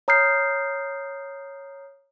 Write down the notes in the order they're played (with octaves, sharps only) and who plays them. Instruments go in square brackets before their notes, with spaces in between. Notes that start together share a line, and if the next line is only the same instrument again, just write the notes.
[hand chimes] C#5 A#5 D#6 F6 G6 C7